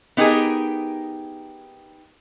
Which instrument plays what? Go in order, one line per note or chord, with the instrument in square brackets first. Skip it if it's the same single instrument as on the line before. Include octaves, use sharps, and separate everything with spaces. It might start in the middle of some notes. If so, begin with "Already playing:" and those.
[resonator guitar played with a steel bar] B3 D#4 G4 G#4 A#4